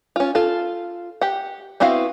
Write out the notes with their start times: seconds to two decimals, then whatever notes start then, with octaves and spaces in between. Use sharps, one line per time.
0.16 C#4 F4
0.35 F4 A4
1.21 G4 F#5
1.80 B3 C4 E4 F#4 F5